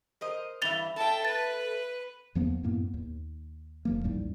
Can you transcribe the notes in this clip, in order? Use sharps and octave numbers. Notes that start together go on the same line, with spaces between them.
A#4 C5 D#5
G2 E3 E5 A6 F7 G7
A4 E5 G5 A5
B4 A6
E2 F3 A#3 B3
F#2 A2 A#3 B3
D#2
E1 F3 A#3
A1 D#2 G#2 G3